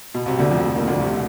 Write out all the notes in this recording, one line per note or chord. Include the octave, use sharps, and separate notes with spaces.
B2
C2 C3
D2 D3
F2 F3
D#2 D#3
D2 D3
C2 C3
B2